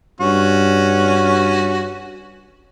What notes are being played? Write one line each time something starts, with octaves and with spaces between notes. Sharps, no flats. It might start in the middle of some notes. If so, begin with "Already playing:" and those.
G2 C#4 F#4